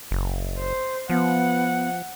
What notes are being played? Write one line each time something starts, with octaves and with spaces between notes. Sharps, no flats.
F#1
C5
F3 B3 F#5